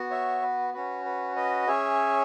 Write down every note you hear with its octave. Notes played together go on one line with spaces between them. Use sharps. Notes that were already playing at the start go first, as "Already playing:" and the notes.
Already playing: B3 F#4
C#5 E5
B4
C#4 F#4 B4
B4
B4 D#5
C#4 G#4 C#5 E5